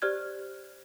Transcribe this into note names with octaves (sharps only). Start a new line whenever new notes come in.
G4 C5 D5 F6 F#6 G#6